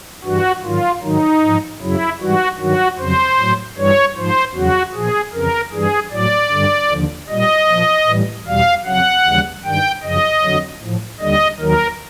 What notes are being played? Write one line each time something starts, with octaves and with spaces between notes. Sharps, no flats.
G2 E3 G3 F#4
G#2 D#3 F#3 F4
G#2 D#3 F#3 D#4
G#2 F3
F#2 C#3 F#3 E4
G#2 E3 G3 F#4
G2 D#3 F#3 F#4
F2 C#3 F#3 C5
A2 F#3
G2 E3 G3 C#5
G#2 F3 C5
E2 C#3 F#3 F#4
A#2 F3 G#4
F2 C#3 E3 A#4
G2 E3 G3 G#4
A2 F#3 D5
G2 D3 G3
D#2 D3 F3
A#2 G3 D#5
A#2 F3
A2 E3 G3
E2 B2 G3 F5
F2 C#3 F#3 F#5
D#2 C#3 E3 G3
G2 D#3 G3 G5
F#2 C#3 F3 D#5
F2 D3 F#3
A2 F3
D#2 D3 G3 D#5
D#2 D#3 F#3 A#4